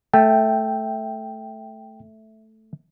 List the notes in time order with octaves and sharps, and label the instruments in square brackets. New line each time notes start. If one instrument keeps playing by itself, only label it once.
[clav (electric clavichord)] A3 [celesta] E5 [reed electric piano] G5